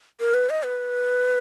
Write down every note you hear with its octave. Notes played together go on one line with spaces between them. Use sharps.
A#4
B4
D#5
B4